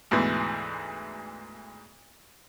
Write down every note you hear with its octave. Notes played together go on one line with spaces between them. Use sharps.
D2 G#2 B2 E3